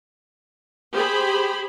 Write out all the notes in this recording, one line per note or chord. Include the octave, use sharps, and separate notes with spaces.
G4 G#4 C5 B5